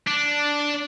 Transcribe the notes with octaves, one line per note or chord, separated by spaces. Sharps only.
D4